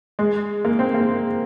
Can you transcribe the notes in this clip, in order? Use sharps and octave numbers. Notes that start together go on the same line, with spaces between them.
G#3
A#3
C4
A#3